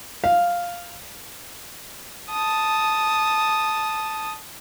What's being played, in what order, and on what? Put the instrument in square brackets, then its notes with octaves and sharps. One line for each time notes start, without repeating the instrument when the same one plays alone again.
[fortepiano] F5
[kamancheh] A5 D#6